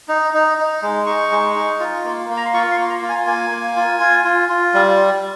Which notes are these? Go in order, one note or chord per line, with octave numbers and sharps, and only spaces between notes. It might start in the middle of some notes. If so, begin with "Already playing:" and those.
D#4
D#4
D#4
G#3
D#4 C#6
G#3
D#4
F4
A#3
A#3
A#5
C6
F4 C#6
C6
A#3
A#5
F4
G#5
A#3 G#5
A#3
F4
F4
F4
F4
G3